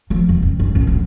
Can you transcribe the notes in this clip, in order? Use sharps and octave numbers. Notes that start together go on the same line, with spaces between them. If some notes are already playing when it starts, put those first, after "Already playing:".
F3 A#3
F1 E2
F#1
G1
A1 D#2
E2 D3